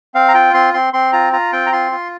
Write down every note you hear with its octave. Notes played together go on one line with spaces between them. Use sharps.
C4 F5
A#5
F4 G5
C4 C6
C4 C6
C4 C6
F4 A#5
F4 A#5
C4 G5
A#5
F4 C6
F4